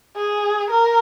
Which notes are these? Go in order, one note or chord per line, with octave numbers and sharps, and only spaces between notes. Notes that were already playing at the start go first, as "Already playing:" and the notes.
G#4
A#4